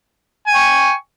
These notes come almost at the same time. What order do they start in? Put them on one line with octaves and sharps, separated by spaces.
G#5 G5 C#6